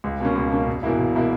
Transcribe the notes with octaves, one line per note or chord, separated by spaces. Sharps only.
C#2
B2 A#3 C#4
C#2
B2 A#3 C#4
E1
E2 B2 A#3 E4
E1
B2 A#3 E4